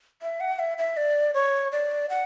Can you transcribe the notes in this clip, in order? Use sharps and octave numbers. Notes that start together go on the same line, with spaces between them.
E5
F#5
E5
E5
D5
C#5
D5
F#5